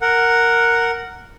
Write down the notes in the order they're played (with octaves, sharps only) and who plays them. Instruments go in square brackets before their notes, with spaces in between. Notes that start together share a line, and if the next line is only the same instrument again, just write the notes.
[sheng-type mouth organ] A#4 F#5